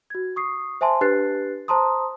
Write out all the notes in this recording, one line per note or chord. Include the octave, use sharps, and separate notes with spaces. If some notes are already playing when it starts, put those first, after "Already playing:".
F#4 G#6
C#6 D#6 C7
C5 E5 G#5 A5 C6
D4 G4 B4 F#6 A6 C7
C5 A5 A#5 C6 D#6